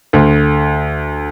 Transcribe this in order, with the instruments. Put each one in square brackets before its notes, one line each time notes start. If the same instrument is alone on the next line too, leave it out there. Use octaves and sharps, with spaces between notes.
[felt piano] D2